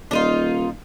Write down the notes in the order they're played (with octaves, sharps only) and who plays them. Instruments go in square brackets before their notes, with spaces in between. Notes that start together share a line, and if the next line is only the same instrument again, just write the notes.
[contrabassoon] D#1 [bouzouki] D4 D#4 F4